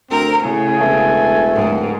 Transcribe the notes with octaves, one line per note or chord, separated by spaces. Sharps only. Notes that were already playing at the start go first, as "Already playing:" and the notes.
D2 C4 A#4
A2 C#3 G#5
E1 A3
D1 G#2